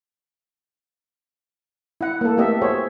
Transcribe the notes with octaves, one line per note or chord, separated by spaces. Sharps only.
E4 F#5
A#3 A4
A3 B3 G4 A#4 D#5 E5
F#4 G#4 C5 C#5 E5